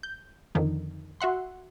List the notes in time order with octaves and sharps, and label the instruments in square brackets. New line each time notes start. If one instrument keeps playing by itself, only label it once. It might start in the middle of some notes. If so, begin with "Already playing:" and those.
[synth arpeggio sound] G6
F2 D3 D#3
F#4 E5 F#5 C6